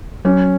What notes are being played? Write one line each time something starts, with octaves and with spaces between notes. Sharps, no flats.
F#3 C#4